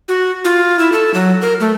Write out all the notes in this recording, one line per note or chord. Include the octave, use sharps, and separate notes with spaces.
F#4
F4
E4
A4
F#3
A#4
A3